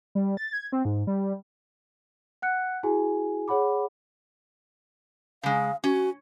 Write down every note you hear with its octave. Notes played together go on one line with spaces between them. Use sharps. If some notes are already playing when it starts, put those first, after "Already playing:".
G3
A6
G#6
C4
G#2
G3
F#5 F#6 C#7
E4 F#4 G#4 G#5
G#4 C#5 F#5 B5 D6
C#3 G#3 F5
C#4 F#4